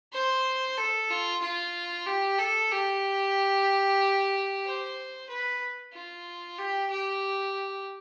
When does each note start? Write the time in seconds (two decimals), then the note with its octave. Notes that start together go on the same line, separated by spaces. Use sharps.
0.13 C5
0.78 A4
1.11 F4
1.42 F4
2.07 G4
2.39 A4
2.71 G4
4.65 C5
5.29 B4
5.93 F4
6.58 G4
6.90 G4